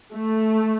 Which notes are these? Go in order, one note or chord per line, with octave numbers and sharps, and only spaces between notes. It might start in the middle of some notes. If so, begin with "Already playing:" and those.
A3